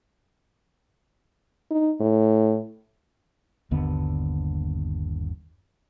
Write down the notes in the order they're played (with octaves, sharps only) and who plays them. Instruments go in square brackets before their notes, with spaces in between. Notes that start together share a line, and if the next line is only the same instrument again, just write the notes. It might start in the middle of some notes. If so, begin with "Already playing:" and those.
[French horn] D#4
A2
[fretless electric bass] G1 D#2 D3 B3